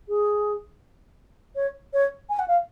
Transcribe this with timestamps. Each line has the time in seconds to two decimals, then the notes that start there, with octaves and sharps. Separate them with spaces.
0.09 G#4
1.56 C#5
1.93 C#5
2.29 G#5
2.39 F#5
2.48 F5